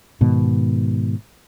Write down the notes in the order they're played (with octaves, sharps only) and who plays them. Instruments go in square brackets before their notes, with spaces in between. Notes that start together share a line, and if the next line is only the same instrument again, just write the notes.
[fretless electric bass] G#2 B2 D#3